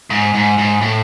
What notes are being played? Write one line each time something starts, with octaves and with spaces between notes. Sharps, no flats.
G#2
G#2
G#2
A2